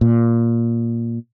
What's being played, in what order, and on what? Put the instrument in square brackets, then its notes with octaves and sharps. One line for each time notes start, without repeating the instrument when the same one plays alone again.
[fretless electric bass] A#2